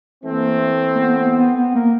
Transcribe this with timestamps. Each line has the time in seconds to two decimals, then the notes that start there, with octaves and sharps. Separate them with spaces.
0.24 E3 A3 A#3 C4
0.95 A#3
0.99 B3
1.11 A#3
1.18 B3
1.37 B3
1.56 B3
1.74 A#3